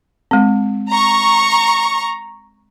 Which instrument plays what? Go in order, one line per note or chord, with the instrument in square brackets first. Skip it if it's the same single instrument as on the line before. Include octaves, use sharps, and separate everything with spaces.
[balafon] G#3 C4
[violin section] A#5 C#6